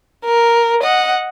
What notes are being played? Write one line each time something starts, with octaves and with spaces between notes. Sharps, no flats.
A#4
D#5 F#5